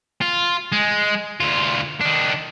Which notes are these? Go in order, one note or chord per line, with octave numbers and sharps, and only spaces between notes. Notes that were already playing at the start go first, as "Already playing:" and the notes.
F4
G#3
D2 F4
D#3 D4